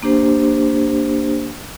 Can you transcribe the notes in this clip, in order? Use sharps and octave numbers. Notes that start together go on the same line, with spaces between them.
A#3 D4 G4 C5